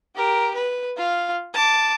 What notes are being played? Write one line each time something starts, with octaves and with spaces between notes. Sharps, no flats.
G4 A#4
B4
F4 F5
A5 D6